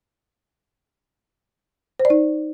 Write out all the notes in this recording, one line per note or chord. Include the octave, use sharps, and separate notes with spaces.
C5
D5
D#4